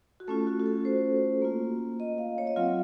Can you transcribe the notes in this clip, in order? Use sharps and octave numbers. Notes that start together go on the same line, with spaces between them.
F#4
A3 C#4 F4 A4
F#4
F#4
A4
C5
A#3 F4
D#5
F5
C#5
D#5
F#3 C4 F4 F5